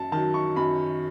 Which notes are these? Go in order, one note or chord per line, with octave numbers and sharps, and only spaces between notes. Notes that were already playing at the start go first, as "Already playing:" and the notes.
Already playing: F#2 A5
D#3 F#3 A5
C#6
F#2 B5